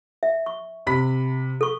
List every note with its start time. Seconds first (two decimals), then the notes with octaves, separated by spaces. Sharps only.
0.23 E5
0.46 C#6
0.87 C3 B5 B6
1.61 A4 C#6